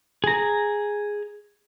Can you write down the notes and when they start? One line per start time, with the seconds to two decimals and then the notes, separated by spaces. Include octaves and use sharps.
0.24 G#4 A#5